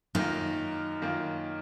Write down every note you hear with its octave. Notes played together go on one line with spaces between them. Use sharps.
F#2 D#3 A#3 D#4 F4
F#2 D#3 A#3 F4